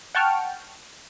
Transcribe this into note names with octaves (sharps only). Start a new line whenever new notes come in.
F#5 G5 A5 C#6 F6